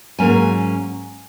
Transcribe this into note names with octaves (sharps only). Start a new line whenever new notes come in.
G#2 F#3 A#3 C#4 G#5